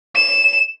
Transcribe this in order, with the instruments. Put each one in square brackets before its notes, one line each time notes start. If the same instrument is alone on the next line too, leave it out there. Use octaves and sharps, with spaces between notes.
[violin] E7